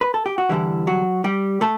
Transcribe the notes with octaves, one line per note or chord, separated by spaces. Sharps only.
B4
A4
G4
F#4
E2 D3 E3 G3 E4
F#3 F#4
G3 G4
A3 A4